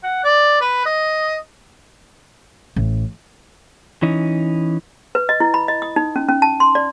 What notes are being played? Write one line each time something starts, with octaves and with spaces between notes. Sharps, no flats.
F#5
D5
B4
D#5
A1
E3 C#4 D#4
B4
D#5
E4
B5
D#5
D#6
D#4
C#4
C#4
A5
C6
D5